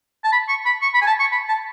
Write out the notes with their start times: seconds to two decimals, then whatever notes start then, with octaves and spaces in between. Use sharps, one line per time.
0.24 A5
0.32 B5
0.49 C#6
0.65 B5
0.82 C#6
0.94 B5
1.02 G#5
1.07 A5
1.20 C#6
1.32 B5
1.49 A5